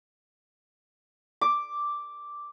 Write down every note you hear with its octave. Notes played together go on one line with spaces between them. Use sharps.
D6